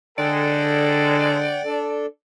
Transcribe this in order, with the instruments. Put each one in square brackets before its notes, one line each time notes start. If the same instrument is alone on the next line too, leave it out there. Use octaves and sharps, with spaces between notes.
[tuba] D3 [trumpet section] G#3 A4 [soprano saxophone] D5 [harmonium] F#5 G5
[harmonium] D4 A4